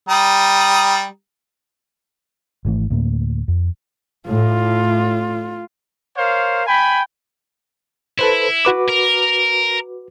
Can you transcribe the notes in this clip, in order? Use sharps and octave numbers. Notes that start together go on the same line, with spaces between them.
G3 A#5 D#6
G#1 E3 A3
D2 A2 A#3
F2
A2 F4
A#4 C5 C#5 F5
G5 G#5 B5
E4 A4 B4 C5
F#4 B4 D6
A#4